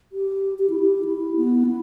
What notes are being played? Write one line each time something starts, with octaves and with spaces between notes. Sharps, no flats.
G4
G4
E4
G4
E4
B3
E4